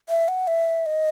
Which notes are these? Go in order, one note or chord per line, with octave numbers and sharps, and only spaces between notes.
E5
F#5
E5
D#5